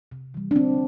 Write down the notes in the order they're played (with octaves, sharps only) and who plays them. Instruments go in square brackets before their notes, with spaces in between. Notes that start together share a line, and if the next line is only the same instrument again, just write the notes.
[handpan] C3
E3 G3
D4
D3 C4